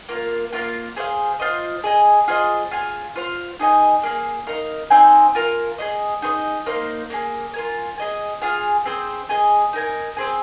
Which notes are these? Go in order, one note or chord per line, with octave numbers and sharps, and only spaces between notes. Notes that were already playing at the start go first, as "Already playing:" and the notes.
A#3 F4 A#4 F5
A#3 F4 A#4 F5
G#4 C5 F5
F4 C5 D#5
G#4 D#5 G#5
F4 G#4 C5 D#5
F4 G#4 F5 G#5
F4 C5 F5
D#4 G#4 D#5 G#5
A#3 G#4 F5
D#4 A#4 F5
C4 D#4 C5 G#5
F4 A#4 F5 G#5
G#4 C5 D#5
D#4 G#4 C5 D#5
A#3 D#4 C5 F5
A#3 D#4 G#4
F4 A#4 G#5
G#4 D#5 G#5
F4 G#4 F5 G#5
C4 G#4 C5
G#4 D#5 G#5
D#4 A#4 G#5
C4 G#4 C5 G#5